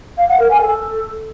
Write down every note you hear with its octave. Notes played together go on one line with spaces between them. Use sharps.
F5
F#5
A#4
G#5
A4